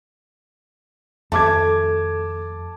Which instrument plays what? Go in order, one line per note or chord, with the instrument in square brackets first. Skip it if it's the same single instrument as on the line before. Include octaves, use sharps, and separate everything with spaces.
[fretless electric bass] F2 D#3 [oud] A3 [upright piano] A5 D6 G#6